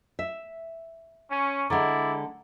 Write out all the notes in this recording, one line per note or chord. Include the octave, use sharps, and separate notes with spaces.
E5
C#4
D3 G#3 E4 D5 F#5 A#5